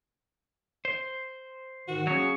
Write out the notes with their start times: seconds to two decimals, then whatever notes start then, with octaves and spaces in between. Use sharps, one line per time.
0.85 C5
1.88 G#2 D#3 F#4
2.07 F#3 A#3 C#4 G#4 C#6